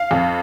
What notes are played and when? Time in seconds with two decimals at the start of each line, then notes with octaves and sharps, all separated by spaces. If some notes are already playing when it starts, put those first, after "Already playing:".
Already playing: F5
0.11 F2